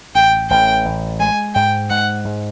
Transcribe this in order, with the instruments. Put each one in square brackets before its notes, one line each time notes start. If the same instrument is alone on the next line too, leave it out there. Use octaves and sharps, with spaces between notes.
[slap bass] A1 [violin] G5
[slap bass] A1 [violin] G5
[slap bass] A1
[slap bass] G#3 [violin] G#5
[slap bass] G#2 [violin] G5
[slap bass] G#2 [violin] F#5
[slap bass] G#2